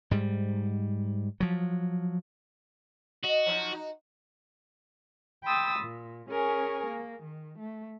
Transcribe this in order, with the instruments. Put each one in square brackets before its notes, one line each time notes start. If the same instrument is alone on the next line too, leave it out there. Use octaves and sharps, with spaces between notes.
[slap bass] G#2 G3
F3 F#3
[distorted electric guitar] F#4 [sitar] D#5
[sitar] F3 F#3 D#4
D#4 F#4
[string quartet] G5 B5 C6 D#6 E6 A6
A#2
C#4 G#4 A#4 G#5 C#6
A#3
D#3
A3